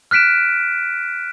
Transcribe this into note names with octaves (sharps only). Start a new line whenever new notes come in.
F6 F#6 B6 D7 E7